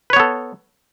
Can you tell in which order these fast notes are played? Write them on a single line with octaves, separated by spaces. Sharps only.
B4 C#5 B3 A4